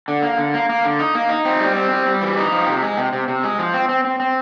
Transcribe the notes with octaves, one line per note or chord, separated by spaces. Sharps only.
D3
A#3
D3
A#3
A#3
D3
D#4
A#3
D#4
C4
G3
C4
G3
G3
E3
D#4
F3
C3
G#3
C3
C3
C3
G#3
F3
C4
C4
C4
C4